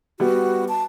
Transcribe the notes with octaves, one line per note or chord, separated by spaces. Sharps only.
G3 B3 F#4
A5